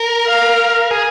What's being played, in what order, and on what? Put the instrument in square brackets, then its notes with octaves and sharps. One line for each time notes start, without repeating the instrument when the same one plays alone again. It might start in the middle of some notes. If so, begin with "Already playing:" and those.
Already playing: [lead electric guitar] A#4
[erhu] F5
[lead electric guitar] G#4